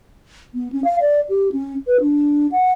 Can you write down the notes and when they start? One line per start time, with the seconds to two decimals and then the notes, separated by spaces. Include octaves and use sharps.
0.54 B3
0.72 C#4
0.84 F5
1.01 D5
1.29 G4
1.52 C#4
1.87 B4
2.01 D4
2.52 F#5